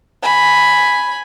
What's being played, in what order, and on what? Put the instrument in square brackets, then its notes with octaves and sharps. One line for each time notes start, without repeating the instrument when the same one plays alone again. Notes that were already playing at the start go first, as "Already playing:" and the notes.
[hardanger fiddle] G#5 B5